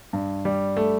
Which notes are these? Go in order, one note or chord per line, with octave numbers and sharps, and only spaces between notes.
G2
G3
A3